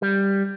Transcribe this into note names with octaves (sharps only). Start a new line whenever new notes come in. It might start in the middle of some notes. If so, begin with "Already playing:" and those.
G3